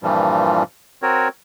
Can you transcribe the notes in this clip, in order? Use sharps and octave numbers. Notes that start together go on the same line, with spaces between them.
G2 A#2 E3 F3 G3
C4 F#4 A#4 C#5